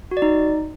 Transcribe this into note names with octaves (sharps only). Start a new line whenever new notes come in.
F#4
D5
D#4